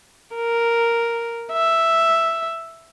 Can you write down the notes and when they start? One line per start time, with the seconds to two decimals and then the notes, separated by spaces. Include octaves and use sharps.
0.35 A#4
1.52 E5